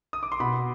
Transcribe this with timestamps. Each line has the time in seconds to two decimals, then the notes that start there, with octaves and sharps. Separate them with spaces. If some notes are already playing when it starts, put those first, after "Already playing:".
0.13 D#6
0.23 D6
0.32 C6
0.40 B2 B5